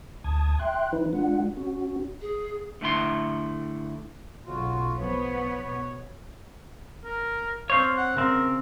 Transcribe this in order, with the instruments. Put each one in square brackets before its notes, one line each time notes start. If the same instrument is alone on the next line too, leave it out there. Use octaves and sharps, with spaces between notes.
[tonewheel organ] D2 A5 D#6 G#6
E5 G5 C6 F#6
E3 D#4 E4 B4
G#3 D4 F4 F#5
C#4 F#4
[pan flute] G#4
[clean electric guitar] D3 A3 E4 C6
[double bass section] B1 C#3 [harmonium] F4 F#4
[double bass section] F3 [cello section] B3 [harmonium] C#5
[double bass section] B2
[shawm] A#4
[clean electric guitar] C4 C5 C#5 [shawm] F5
[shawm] F#5
[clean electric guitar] C#3 C4 [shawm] A#4